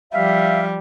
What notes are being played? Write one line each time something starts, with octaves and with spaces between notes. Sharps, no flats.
F3 G3 E5 F5